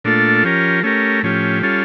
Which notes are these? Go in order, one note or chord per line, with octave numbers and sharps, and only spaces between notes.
A#2 A3 D4 F4 A4
F3 C#4 G4 A#4
A3 C#4 G4 A#4
A2 F3 C#4 G4
G3 C#4 F4 A4